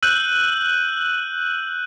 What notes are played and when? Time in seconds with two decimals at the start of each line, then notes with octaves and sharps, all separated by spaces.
0.03 E6 F#6 G6 D#7 F#7